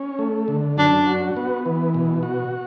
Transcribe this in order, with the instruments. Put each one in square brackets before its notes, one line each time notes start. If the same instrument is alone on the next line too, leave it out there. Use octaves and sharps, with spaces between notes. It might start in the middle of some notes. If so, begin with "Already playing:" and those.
Already playing: [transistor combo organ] C#4
A3
D3
[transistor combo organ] F#2 [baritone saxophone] D4
[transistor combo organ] F#4
B3
E3
B2
F#4